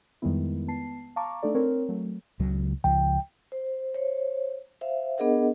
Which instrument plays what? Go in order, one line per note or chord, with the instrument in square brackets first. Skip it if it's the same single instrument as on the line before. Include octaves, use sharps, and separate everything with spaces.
[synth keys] F2 D#3 G3 G#3 B3 E4
B3 A5 C7
F5 A5 A#5 C#6 D6
A3 D4 D#4 A4 D5
C4 A#4 C#5
F#3 A3
[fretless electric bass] C#2 C#3 F#3
[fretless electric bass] C#2 F3 [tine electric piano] G5
[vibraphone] C5
C5 C#5
C5 E5 F5
B3 D4 G#4 A#4 D#5 F#5